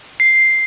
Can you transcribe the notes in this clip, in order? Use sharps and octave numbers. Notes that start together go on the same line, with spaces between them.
C7